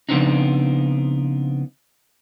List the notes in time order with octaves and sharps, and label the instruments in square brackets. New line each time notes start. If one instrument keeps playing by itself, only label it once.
[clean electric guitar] C#3 F3 B3 C4 D4 D#4